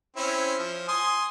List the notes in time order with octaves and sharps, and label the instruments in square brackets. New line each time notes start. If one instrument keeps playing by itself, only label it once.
[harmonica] C4 C#4 E4
F3
G#5 C6 D#6